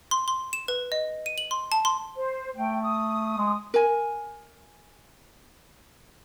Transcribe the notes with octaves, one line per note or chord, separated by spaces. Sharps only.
C6
C6
E7
B4
D#5
D#7
F#7
C6
A5
C6
C5
A3 G5
D#6
G#3
A#4 G#5